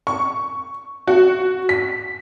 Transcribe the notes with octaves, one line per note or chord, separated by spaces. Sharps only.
C#6
F#4
B6